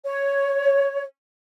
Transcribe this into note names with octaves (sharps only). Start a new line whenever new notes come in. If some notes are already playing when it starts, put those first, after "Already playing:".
C#5